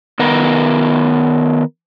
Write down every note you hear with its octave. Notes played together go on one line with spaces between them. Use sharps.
D#3 B3 A#4